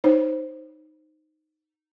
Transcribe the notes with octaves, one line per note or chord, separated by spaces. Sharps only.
D#4 C5 C#5